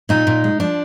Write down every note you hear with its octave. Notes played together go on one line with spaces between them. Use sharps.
A#2 D#4
A#2
G#3
F3 D4